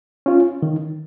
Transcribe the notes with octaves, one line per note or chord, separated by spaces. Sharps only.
C#4 F4
D#3